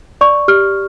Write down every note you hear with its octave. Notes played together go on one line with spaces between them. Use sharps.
D5 C#6
G4 F6